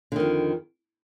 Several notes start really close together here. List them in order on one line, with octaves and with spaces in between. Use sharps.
D3 D#3 F2